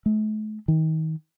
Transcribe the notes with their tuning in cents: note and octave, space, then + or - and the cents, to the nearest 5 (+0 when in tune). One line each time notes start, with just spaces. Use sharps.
A3 -40
D#3 +30